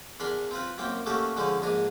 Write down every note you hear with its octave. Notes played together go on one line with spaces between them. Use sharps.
E2 D4 A#4 B5 C6
C4 F4 B4
F#2 A#3 C4 G5
A3 A#3 C#4 F#4 G4 A4
D3 F3 G#3 C#4 D#4
A#1 G#2 D4 G#5 A#5